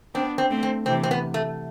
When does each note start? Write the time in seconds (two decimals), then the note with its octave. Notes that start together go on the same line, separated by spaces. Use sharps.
0.14 B3 C4 D4
0.38 C4
0.50 A3 C4
0.63 C4
0.86 C3 E3 C4
1.03 C4
1.11 B3
1.34 A3